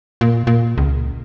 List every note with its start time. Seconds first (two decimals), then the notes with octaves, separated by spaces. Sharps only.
0.21 A#2
0.47 A#2
0.78 C#2